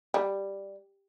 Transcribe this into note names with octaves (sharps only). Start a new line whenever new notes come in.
G3